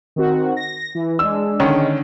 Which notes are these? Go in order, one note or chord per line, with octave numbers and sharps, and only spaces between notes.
D#3 C4 F#4
A#6
E3
G#3 D4 E6
D3 D#3 C#4